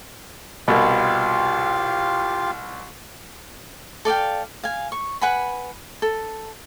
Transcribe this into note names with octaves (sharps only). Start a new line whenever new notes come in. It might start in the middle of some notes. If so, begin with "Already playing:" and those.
C2 B2 F4 G4 F5
A4 D5 F5 G5
F5 G#5
C#6
B4 F#5 G#5 B5
A4